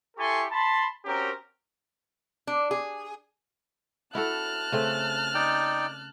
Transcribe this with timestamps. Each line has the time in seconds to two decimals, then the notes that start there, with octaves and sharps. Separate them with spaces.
0.17 E4 G4 A4 G#5 C6 C#6
0.50 A5 B5 C6
1.05 C4 C#4 F#4 G4 A#4
2.47 D4
2.71 G#4
4.15 E4 F#4 A4 A5 F6 F#6
4.72 C#3 A3 C4
5.35 D#4 D5 G5